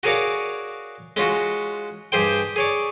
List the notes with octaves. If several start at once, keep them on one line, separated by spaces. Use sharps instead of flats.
F#4 G#4 A#4 C#5 D5 F5
G#3 C#4 F4 F#4
G2 G4 G#4 C5 G5
G#4 C#5 D5